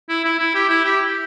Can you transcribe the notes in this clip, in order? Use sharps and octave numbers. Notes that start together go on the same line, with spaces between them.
E4
E4
E4
G4
E4
G4